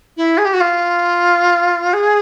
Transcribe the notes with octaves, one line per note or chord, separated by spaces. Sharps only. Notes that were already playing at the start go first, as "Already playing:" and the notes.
E4
G#4
G4
F#4
F4
G#4